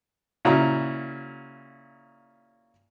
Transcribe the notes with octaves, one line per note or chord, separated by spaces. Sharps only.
A#2 C#3 E4 F#4 A#5